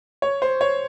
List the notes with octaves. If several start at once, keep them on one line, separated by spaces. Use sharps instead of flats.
C#5
C5
C#5